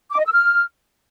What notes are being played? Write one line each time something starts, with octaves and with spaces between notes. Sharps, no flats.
D6
D#5
E6
F6